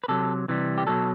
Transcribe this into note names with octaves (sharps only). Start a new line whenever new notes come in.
B4
C3 F#3 A4
C3 E3 G3
G4
B2 F#3 A4